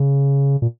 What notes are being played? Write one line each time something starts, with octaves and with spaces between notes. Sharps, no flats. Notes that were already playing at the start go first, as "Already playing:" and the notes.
Already playing: C#3
A#2